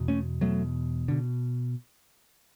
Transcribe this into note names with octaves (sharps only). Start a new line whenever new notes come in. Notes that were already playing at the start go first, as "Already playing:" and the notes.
Already playing: E2 B2
A3 C#4
E2 B2 F#3 A3
B2 D3